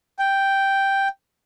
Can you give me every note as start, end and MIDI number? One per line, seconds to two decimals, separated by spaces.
0.19 1.08 79